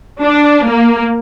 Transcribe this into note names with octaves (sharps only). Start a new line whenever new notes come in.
D4
A#3